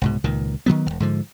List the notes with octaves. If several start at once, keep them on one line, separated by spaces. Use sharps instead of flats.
C2 G#2 B2
C#2 A#2 D#3
D#3 F3 F#3 B3
E1 C2
G#2 D3 F3